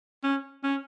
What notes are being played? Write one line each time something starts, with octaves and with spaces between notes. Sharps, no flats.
C#4
C#4